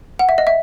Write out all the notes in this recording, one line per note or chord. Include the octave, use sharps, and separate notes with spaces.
F#5
E5
D#5
E5